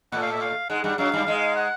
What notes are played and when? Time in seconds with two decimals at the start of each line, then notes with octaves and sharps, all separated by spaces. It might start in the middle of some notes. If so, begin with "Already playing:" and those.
0.12 A2 A3 F#5
0.22 F5
0.32 E5
0.42 F5
0.70 G#2 G#3 F#5
0.84 G2 G3 F#5
0.98 F#2 F#3 F5
1.14 G2 G3
1.27 G#2 G#3
1.56 F#5